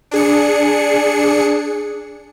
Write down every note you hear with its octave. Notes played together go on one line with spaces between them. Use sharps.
D4 G#4 C#7